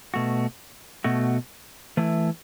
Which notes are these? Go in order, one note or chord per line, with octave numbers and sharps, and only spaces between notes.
B2 A3 F#4
B2 A3 F#4
E3 A3 E4